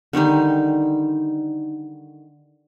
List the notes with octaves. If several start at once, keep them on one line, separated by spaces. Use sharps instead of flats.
D3 D#3 G3 D#4